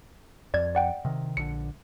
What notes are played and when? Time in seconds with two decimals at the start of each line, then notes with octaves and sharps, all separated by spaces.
0.54 F2 D5 G#6
0.75 D5 F#5 G5
1.05 C3 D#3
1.37 A#1 D3 C#7